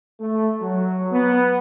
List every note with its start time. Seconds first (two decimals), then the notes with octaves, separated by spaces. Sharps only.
0.19 A3
0.61 F#3
1.12 B3